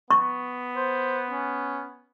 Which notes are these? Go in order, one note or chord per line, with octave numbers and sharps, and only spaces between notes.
B3 C#6
C5
C#4